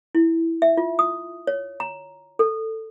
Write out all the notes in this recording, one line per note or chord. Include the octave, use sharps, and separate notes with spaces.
E4
E5
F4
D#6
C#5
A#5
A4